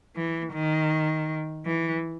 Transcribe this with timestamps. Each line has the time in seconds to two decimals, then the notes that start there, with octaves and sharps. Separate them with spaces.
0.16 E3
0.54 D#3
1.66 E3